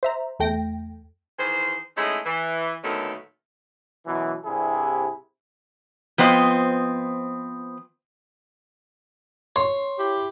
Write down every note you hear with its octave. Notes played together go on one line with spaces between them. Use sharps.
C5 E5 A#5
E2 A3 G5 A#6
D#3 E3 G#4 C5
G#3 A3 C#4 D#4 E4
E3
A#2 D3 D#3 F#3 A3 B3
F#2 B2 E3
C2 G2 C3 E4 G#4
F3 B3 C4 D#5
C#5 C6
E4 G4